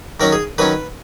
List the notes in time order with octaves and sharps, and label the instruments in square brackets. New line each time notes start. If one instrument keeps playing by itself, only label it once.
[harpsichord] D#3 F#3 C#4 A#4
G#4
D#3 F#3 C#4 B4